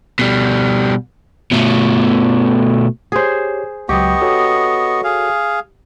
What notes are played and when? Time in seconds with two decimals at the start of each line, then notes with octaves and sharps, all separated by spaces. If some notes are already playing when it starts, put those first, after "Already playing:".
0.19 B2 G3
1.51 B2 A3
3.12 G4 G#4 C5 C#5
3.89 C#2 F#3 B3 G4 D#5 C#6
4.22 F#4 A4 C#5
5.04 G#4 F5